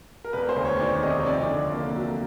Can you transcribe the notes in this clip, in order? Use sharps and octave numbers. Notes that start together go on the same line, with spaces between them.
A#4
E1 B4
C5
D2
C#5
D#3 D5
C3 D#5
C#5
F2 D5
D3
A#3
F#3